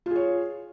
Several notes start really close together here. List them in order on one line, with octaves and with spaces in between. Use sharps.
F4 G#4 C#5